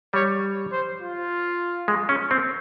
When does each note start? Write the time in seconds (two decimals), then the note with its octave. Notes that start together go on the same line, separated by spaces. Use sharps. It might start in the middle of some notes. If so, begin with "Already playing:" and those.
0.14 G3 C#5
0.72 C5
1.01 F4
1.88 G#3
2.09 C#4
2.31 C4